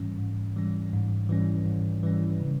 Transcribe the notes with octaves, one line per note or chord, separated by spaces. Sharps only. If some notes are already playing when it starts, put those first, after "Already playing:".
Already playing: G#2 E3 G3 C#4
G#2
E3 G3 C#4
G#2
E3 G3 C#4
G#2
E3 G3 C#4
C#3